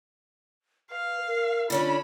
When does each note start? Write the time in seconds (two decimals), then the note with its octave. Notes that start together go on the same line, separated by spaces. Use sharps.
0.91 B4 F5
1.27 A#4
1.70 D3 C#4 D4 F4 B5